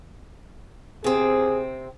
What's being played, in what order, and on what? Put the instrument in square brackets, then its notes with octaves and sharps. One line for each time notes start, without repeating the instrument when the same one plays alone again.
[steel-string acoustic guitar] C3 C4 [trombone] G#4